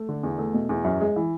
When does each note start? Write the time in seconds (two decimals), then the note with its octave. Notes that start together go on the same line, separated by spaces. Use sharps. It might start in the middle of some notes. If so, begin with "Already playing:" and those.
Already playing: A3
0.09 D3
0.23 E2
0.39 A3
0.54 B2
0.69 E2
0.84 F#2
1.01 G#3
1.16 E3